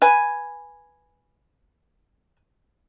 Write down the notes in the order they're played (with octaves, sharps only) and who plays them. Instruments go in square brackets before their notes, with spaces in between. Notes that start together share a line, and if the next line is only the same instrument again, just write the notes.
[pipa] B4 G#5